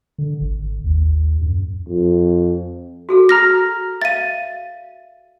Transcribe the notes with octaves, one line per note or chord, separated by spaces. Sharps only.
D3
G#1
D#2
F#2
F2
F#4 G#4 A4
A#5 F6 A#6
E5 F5 A6 D#7